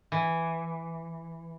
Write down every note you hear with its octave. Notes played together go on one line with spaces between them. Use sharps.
E3